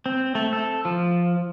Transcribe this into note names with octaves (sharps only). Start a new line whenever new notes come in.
C4
A3
A4
F3